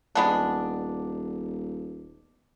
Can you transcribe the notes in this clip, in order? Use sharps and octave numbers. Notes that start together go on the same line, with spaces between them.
D#1 G#3 B3 D4